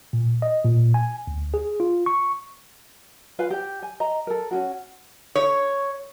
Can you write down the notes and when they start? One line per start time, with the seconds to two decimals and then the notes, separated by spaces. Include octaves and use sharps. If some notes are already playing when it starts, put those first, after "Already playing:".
0.13 A#2
0.42 D#5
0.64 A#2
0.94 G#5
1.27 D2
1.54 G#4
1.80 F4
2.06 C#6
3.39 F4 B4 F5 G#5
3.50 G4 G5
3.83 G#5
4.00 D#5 A#5
4.27 A4 A#4
4.51 C#4 F4 F#4
5.35 C#5